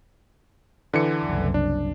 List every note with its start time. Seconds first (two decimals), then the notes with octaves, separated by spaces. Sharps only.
0.93 D3 E3 C#7
1.25 F#1 C2
1.54 D4